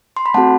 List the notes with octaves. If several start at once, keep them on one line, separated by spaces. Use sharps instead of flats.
C6
B5
A3 C4 F#4 A4 F#5 A5